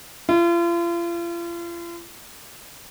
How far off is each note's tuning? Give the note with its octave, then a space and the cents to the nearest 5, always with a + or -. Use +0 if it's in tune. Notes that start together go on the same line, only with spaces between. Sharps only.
F4 -40